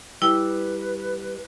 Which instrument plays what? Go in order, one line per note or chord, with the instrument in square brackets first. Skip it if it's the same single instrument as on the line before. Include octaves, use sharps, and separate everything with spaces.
[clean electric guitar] G3 [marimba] E4 G5 [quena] B4